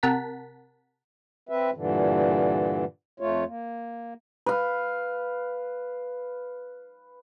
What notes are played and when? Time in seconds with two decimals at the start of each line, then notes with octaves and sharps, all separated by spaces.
0.03 C3 A#4 F#5 A5 B6
1.49 C4 B4 E5
1.74 G2 A#2 D3 E3
3.20 F2 A3 F4 C#5
3.46 A#3
4.46 B4 F5